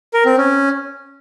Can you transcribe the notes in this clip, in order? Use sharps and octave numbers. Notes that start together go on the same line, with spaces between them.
A#4
C4
C#4